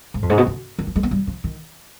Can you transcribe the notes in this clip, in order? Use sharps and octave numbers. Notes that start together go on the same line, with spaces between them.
G#2
F2
G#2
B2
D3
D#3
F3
G#3
B3
G3
F3
D#3